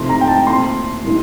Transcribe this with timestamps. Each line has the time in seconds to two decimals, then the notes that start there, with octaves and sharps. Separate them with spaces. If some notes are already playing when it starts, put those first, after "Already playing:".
Already playing: C3 F3 A3 D#4 C6
0.09 A#5
0.21 G5
0.28 A5
0.46 A#2 A3 C4 C6
1.04 A2 G3 A#3 D#4